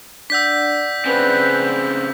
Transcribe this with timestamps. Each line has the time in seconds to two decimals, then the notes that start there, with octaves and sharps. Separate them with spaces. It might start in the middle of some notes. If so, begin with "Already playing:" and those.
0.30 D4 D5 F#5 E6 G6 B6
1.06 C#3 C4 B4